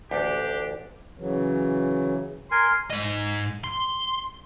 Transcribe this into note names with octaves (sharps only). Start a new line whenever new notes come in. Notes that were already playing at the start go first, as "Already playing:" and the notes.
A1 D2 D4 G4
C#3 E3 F#3
A#4 G#5 C6
G#2 D#5
C6